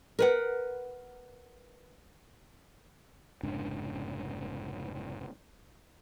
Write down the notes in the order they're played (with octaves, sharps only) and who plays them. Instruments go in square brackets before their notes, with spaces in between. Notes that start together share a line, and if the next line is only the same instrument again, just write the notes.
[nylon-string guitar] A#4 B4 F#5
[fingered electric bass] F1 G#2 C#3 D4